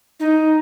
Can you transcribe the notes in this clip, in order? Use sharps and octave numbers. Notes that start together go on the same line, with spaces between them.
D#4